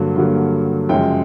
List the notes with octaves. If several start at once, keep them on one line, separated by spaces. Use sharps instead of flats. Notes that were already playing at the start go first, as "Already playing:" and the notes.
Already playing: G2 D3 F#3 A#3
G2 D3 F#3 A#3
F#2 C#3 F3 G#3 G5